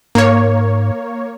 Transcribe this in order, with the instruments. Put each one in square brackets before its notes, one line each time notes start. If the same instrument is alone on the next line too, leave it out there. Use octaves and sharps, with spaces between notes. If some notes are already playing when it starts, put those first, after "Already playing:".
[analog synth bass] G#2 [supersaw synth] A#3 C#5